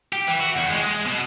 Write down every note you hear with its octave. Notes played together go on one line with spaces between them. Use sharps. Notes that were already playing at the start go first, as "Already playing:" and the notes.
G4
E3
F#4
E2
G#3
G#3
B2